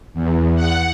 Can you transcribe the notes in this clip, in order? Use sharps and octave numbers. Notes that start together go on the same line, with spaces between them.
E2
F#5